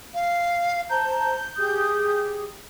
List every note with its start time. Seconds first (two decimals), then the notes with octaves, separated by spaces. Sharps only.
0.14 F5
0.90 C5 A5 A#5 G6
1.57 G4 G#4 D#6